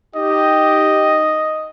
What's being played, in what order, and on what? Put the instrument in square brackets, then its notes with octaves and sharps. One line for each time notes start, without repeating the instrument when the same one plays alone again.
[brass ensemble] D#4 G4 [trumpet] D#5